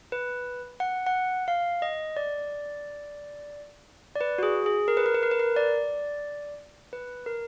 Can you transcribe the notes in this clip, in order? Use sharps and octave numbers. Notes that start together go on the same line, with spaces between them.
B4
F#5
F#5
F5
D#5
D5
D5
B4
F#4
G#4
G#4
A#4
B4
A#4
B4
A#4
B4
A#4
D5
B4
A#4